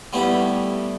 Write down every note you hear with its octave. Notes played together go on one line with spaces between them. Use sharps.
G3 A3 B3 E4 G4